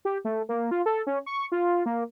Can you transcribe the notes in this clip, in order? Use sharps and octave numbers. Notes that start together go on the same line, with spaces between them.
G4
A3
A#3
F4
A4
C#4
C#6
F4
A#3